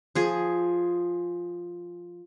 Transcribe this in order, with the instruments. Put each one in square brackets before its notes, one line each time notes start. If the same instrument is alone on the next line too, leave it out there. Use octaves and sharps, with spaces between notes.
[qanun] F3 G#4